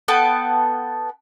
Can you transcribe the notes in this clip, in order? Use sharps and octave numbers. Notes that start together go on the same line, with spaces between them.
B3 A4 G5 A5